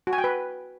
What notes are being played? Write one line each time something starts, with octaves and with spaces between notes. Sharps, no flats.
F#4
G#5
G5
B4